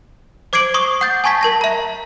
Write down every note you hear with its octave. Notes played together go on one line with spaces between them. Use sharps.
C5 D6 G#6 C7 D7 F#7
C#6 D#6 G7
F#5 G6 A6
G#5 A5 C#6 G#6 B6
A#4 A5 A#6
E5 A#5